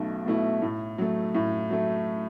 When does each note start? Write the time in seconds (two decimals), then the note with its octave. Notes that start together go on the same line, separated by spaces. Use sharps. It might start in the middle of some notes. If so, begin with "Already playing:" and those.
Already playing: B1 B2 A3
0.26 B2 A3 E4
0.62 A2
0.98 F#3 A3
1.35 A2
1.70 F#3 A3